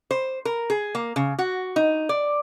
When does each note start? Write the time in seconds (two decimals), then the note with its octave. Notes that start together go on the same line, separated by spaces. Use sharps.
0.11 C5
0.45 A#4
0.70 G#4
0.95 A#3
1.16 C#3
1.39 F#4
1.76 D#4
2.09 D5